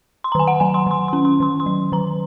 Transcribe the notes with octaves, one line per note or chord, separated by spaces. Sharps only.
C6
A#5
D#3 G#5
F#5
F#3 G#5
C6
D#3 C6
C6
C#4
C6
D#3 C6
C6
F#3
D#3 A#5